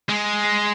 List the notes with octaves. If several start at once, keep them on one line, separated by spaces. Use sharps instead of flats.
G#3